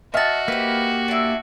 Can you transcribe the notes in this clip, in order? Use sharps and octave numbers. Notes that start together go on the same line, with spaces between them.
F#4 D#5 E5 A5 C#6 F6
A#3 G4 B4 C5
D4 E4